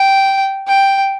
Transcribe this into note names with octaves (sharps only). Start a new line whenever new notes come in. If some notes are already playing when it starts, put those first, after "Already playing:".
Already playing: G5
G5